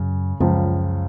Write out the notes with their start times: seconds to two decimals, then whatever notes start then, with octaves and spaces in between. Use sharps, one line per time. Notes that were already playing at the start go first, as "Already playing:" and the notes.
Already playing: F#2 C#3
0.40 C#2 F#2 C#3 F3